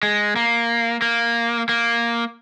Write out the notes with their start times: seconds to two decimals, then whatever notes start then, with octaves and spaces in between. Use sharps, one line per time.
0.03 G#3
0.36 A#3
1.02 A#3
1.69 A#3